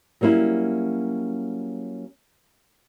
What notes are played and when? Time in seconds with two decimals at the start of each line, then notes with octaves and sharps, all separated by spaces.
0.21 F#3 G3 A#3 C#4 E4